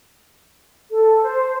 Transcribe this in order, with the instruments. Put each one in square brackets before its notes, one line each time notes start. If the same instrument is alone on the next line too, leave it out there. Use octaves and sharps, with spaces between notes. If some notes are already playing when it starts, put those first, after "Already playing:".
[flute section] A4
C5